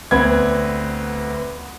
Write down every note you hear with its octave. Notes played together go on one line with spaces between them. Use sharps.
D2 B3 C4 B4 B5 G#6